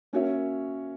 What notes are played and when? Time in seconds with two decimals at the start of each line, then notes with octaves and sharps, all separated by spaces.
0.13 A#3 C#4 F#4 C#5 E5